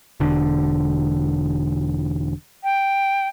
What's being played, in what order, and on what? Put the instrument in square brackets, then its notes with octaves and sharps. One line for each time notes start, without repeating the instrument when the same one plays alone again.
[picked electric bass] E1 D3
[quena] G5